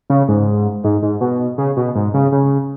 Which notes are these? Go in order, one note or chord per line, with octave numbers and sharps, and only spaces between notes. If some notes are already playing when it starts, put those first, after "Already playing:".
C#3
G#2
G#2
G#2
B2
C#3
B2
G#2
C#3
C#3